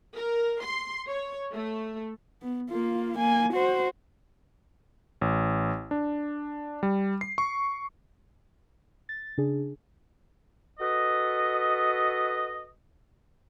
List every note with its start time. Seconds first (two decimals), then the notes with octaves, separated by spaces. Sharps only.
0.15 A#4
0.63 C6
1.08 C#5
1.52 A3
2.42 B3
2.70 A#3 F4
3.17 A#3 G#5
3.53 F#4 C5
5.21 A1
5.91 D4
6.83 G3
7.21 C7
7.38 C#6
9.09 A6
9.38 C#3 D4 G#4
10.79 F#4 A4 B4 D#5